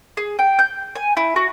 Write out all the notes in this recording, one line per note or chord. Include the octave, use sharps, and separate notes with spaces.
G#4
G5
G6
G#5
E4
F#4